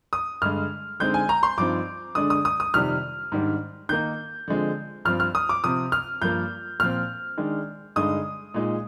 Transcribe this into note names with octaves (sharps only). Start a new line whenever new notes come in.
D#6
G2 D3 G#3 F6
D3 G#3 C4 D#4 G6
G#5
A#5
C6
G2 F3 C4 D#4 D6
D3 G#3 D4 D#6
D#6
D#6
D#6
F2 C3 D#3 G3 F6
G#2 D#3 G3 D4
D#3 A#3 D#4 G6
D3 F3 G#3 C4
G2 F3 C4 F6
F6
D#6
D6
C3 F3 C4 D#6
F6
G2 F3 A#3 G6
A#2 F3 C4 F6
D#3 G#3 D4
G2 D3 G#3 D#4 D#6
A#2 G#3 D#4